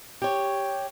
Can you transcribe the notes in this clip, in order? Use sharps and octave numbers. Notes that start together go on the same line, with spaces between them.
G4 C#5